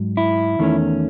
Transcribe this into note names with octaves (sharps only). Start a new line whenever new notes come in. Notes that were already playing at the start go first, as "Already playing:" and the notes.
Already playing: G#2 F#3
E4
E2 D#3 A3 C#4